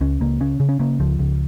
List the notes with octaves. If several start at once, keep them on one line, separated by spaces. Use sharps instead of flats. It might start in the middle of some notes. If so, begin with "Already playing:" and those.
C#2 C#4
C#2 A#3
C#3 C#4
C#3
C#4
C#3 A#3
C#2 F3
C#2